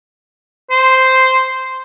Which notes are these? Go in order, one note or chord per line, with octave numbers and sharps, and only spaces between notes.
C5